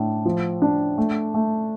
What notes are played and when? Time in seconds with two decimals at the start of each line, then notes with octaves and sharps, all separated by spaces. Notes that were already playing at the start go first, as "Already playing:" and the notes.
Already playing: A2 D4
0.25 F3
0.62 D4
0.98 A3
1.34 A3